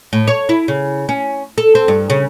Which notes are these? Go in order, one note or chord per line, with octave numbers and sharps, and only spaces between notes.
A2
C#5
E4
C#3
C#4
A4
C4
G2
C#3